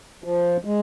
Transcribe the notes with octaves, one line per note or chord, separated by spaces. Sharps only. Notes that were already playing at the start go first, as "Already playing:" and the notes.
F3
G#3